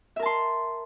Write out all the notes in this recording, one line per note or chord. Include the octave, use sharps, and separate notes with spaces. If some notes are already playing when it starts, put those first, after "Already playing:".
A#4 E5 A5 C6